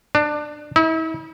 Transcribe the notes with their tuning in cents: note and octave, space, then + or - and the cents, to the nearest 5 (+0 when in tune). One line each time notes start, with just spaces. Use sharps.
D4 +20
E4 -40